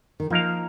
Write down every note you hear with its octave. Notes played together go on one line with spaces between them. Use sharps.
D#3
F3 A#3 D#4 A#4 F5